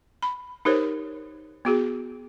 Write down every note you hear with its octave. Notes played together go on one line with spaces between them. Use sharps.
B5
D#4 G4 A#4 C5 C#5
B3 F#4 G#4